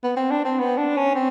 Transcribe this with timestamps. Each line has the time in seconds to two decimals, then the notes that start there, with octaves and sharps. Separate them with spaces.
0.04 B3
0.16 C4
0.31 D4
0.45 C4
0.59 B3
0.78 D4
0.97 C#4
1.15 C4